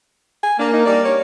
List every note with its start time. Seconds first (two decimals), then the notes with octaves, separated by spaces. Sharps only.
0.43 G#5
0.59 A#3 D4
0.73 D#4
0.85 G3 A#3 D4 D5
1.05 C#5